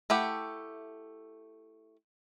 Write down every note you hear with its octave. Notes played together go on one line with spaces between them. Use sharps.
A3 E4 G4 F#5